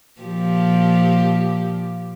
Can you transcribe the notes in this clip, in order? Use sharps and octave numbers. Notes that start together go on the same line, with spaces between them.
A#2 F3 G4